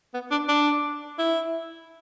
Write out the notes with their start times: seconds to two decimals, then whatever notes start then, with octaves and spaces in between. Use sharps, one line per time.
0.14 B3
0.31 D4
0.49 D4
1.18 E4